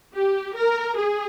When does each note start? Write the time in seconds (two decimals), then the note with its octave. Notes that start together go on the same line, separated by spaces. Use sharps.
0.16 G4
0.56 A#4
0.98 G#4